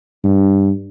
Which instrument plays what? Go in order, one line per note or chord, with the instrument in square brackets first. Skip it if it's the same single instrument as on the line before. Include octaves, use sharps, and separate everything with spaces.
[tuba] G2